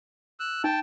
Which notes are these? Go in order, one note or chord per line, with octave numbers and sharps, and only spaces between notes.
E6 F#6
D#4 G5 A5